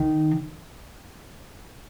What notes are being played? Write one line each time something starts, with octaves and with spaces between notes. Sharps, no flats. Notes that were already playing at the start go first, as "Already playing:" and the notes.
Already playing: D#3